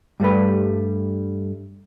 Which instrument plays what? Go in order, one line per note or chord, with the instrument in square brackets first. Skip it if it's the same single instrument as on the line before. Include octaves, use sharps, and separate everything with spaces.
[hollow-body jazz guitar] G2 G3 A3 B4